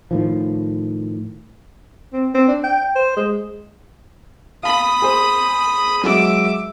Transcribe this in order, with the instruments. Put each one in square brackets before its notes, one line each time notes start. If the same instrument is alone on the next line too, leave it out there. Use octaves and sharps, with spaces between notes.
[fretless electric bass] A2 D#3 F3
[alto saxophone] C4
C4
D4
G5
C5
G#3
[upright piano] F5 A5 [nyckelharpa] B5 D#6
[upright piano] G#4 C5
[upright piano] F#3 G#3 F#4 [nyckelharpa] E5 D6